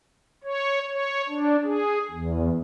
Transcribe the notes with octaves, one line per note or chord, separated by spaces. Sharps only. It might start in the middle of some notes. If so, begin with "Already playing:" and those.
C#5
C#5
D4
G#4
E2